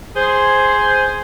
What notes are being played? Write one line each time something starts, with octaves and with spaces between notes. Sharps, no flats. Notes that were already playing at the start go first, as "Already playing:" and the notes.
G#4 C5